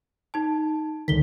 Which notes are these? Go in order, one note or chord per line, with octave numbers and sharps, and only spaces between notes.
D#4 A5
C#2 D3 D#3 B6 G7